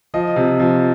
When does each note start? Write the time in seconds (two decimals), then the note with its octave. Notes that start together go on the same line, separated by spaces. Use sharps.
0.14 F3 D#5
0.36 C3
0.60 F3